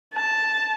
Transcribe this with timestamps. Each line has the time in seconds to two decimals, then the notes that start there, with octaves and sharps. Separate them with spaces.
0.14 A5